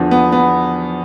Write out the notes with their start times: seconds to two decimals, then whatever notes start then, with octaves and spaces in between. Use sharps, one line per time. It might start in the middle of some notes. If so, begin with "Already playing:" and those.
Already playing: E2 D3 F3
0.11 B3
0.32 B3